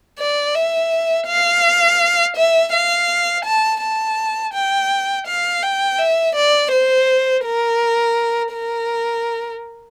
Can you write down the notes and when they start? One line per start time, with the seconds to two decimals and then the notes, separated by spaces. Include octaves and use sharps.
0.19 D5
0.55 E5
1.28 F5
2.36 E5
2.73 F5
3.45 A5
3.81 A5
4.54 G5
5.27 F5
5.63 G5
5.99 E5
6.35 D5
6.72 C5
7.44 A#4
8.53 A#4